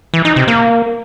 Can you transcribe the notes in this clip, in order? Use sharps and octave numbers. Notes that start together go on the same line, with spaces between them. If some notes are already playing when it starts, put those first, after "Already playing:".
E3
D#4
C3
A#3